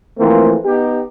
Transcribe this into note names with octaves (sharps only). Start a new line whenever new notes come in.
E3 F3 A3 A#3 C4
B3 D#4 G4